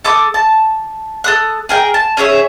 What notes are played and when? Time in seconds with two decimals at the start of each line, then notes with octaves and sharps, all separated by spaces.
0.04 A4 D6 D#6
0.34 A5
1.24 A4 D#6 F#6
1.69 G#4 A#4 G5
1.94 A5
2.17 C#4 G#4 C#5 E5